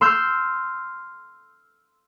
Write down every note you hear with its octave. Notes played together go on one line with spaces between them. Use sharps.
C6 E6 F6 G6 C7